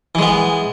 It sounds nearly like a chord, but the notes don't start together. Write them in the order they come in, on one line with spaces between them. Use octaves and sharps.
E3 G#3 B3